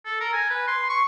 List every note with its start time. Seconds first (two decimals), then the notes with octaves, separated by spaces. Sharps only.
0.05 A4
0.20 A#4
0.33 G#5
0.50 B4
0.68 C6
0.89 C#6